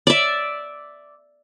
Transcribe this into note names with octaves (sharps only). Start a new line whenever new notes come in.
D5 E5